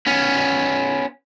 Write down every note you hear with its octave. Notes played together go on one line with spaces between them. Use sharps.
B3 C#4